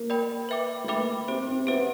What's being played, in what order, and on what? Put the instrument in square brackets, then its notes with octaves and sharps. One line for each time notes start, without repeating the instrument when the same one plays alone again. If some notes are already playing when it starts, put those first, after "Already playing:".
Already playing: [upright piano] A#3
[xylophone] A#4 D5 G5 B5
B4 E5 G5 B5 D6
[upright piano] A3
[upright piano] A#3 [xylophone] B4 E5 G5 B5 D6
[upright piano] C4 [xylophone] G4 C5 E5
[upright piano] C4
[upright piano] B3 [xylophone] G4 C5 E5